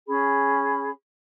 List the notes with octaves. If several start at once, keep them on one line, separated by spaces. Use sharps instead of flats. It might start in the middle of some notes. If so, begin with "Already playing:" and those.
C#4 G#4 B5